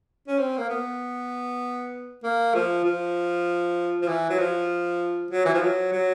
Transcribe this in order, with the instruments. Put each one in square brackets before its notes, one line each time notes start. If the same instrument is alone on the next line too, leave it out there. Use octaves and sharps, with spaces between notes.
[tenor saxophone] C#4
C4
A#3
B3
A#3
F3
F3
F3
E3
F#3
F3
F#3
E3
F3
F#3
F#3